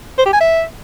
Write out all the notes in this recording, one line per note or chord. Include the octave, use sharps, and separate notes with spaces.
C5
G4
G#5
E5